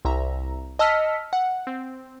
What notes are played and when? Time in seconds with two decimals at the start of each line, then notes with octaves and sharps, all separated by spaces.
0.05 C2 E5 A#5
0.79 D#5 A5 E6 F6 B6 C#7
1.33 F#5
1.67 C4